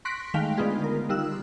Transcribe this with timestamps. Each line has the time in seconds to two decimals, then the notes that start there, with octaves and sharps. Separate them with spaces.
0.05 C6 C#6 F#6 A#6 B6 D7
0.34 D#3 G#3 A3 F5 G5 B6
0.58 D3 B3 D#4 F4 G#4
0.84 A#4
1.09 G3 D#4 F4 E6 F#6